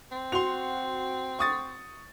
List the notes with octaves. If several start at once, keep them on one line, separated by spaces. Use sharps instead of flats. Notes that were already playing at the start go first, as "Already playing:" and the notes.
C4
F#4 C6 F7
C#6 D#6 A6